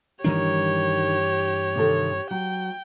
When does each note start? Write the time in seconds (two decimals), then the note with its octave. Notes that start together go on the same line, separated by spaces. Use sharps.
0.24 G2 D#3 E3 D4 D#4 G4 C#5
1.75 C3 D#3 A4
2.31 F#3 G5